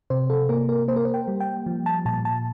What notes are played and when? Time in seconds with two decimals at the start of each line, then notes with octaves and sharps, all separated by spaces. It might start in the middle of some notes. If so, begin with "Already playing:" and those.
0.10 C3 C5
0.30 A4
0.49 A#3 A#4
0.69 A#4
0.88 A#3 C5
0.96 A#4
1.05 C5
1.14 G5
1.28 G3
1.40 G5
1.66 F3
1.86 A5
2.05 A#2 A5
2.25 A5